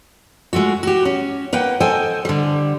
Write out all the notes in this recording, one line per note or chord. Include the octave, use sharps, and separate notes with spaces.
G#3 A3 F4 F#4
F#4 G4
C#4
A#3 B4 F#5 G5
A4 C5 D#5 G5 G#5
D3 G3